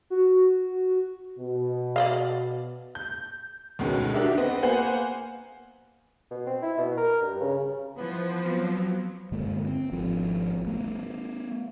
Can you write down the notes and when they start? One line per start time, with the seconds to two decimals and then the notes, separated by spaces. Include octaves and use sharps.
0.10 F#4
1.39 B2
1.96 D5 D#5 F5
2.95 G6
3.79 D2 B2 D#3 G#3 B3 C#4
4.14 D4 F#4 G4 A#4 E5
4.38 B3 C4 D#5 F#5
4.63 A#3 B3 C5 F#5 G#5
6.31 B2
6.46 C4
6.62 E4
6.78 B2
6.97 A#4
7.22 G2
7.41 C#3
7.98 E3 F3 B3 B4 C5
8.43 F#3 B3 C4 F4
9.32 G2 D3 G#3 A#3
9.67 C4
9.92 G#1 F3 C4
10.67 A3 B3